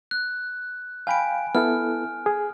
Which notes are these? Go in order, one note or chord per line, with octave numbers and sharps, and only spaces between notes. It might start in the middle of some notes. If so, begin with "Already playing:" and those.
F#6
F5 G5 G#5 B5 D7
B3 E4 A4 F6
G#4